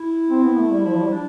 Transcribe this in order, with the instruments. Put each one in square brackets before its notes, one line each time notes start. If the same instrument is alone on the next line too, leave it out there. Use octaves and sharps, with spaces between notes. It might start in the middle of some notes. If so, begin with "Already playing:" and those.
Already playing: [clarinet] E4
[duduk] C4
B3
A3
G3
[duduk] F3 [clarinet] E4
[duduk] F3
G3
[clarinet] D4